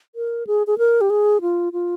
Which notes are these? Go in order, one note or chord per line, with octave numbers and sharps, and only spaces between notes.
A#4
G#4
G#4
A#4
G4
G#4
F4
F4